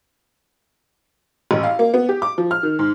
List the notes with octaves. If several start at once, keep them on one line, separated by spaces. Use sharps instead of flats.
A1
F5
A#3
B3
G4
D6
F3
F6
D#3
G#2